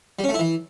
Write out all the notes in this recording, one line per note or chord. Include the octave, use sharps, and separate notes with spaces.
G3
C#4
A3
E4
E3